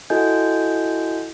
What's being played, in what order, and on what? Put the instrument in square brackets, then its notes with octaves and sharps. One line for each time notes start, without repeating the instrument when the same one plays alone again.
[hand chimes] E4 F#4 A4 D#5 G#5 G6